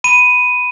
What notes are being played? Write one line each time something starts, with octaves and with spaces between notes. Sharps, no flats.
B5 D#7